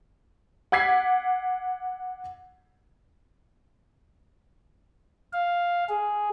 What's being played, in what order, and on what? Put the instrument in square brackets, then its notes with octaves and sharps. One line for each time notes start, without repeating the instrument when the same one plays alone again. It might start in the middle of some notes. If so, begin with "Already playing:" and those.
[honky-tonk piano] F#5 D6 G#6 B6 C7
[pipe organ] F5
G#4